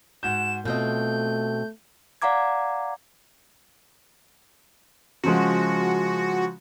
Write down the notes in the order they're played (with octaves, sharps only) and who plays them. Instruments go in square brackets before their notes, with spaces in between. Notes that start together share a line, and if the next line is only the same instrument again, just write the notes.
[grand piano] G#2 F#4 G6 [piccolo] E7
[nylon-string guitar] B2 C4 D#5 [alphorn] A3 [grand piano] F4 [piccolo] G6
[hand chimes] D5 F5 F#5 A#5 D6 G#6
[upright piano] C#3 F3 G#3 [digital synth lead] F#4